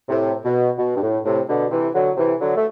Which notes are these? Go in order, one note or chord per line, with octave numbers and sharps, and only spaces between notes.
A2 C3
B2
B2
G2
A2
A2 C3
B2 D3
C3 E3
D3 F#3
C3 E3
D3 F#3
A3